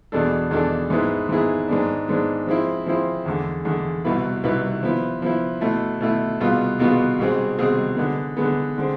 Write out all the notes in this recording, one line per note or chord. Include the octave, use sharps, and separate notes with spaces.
E2 B2 G#3 D4 A4
E2 B2 G#3 D4 A4
G#2 G#3 B3 E4 G#4
G#2 G#3 B3 E4 G#4
G#2 G#3 B3 D4
G#2 G#3 B3 D4
F3 G#3 C4 E4
F3 G#3 C4 E4
E2 D3 G#3
E2 D3 G#3
C2 B2 B3 E4 B4
C2 B2 B3 E4 B4
F3 B3 E4
F3 B3 E4
B2 A3 E4
B2 A3 E4
C2 B2 B3 F4 G#4
C2 B2 B3 F4 G#4
C2 B2 G#3 C4 G#4
C2 B2 G#3 C4 G#4
D3 G#3 B3
D3 G#3 B3
D3 G#3 C4